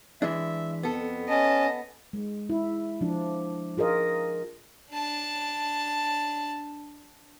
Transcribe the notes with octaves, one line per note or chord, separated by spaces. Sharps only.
E3 G#3 D4 E5
F2 B3 A4
C#4 D#5 A5
G#3
E4
F3 D4
F4 G#4 A#4 D#5
D4 A5